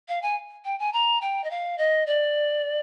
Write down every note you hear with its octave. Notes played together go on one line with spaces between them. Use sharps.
F5
G#5
G5
G#5
A#5
G5
D#5
F5
D#5
D5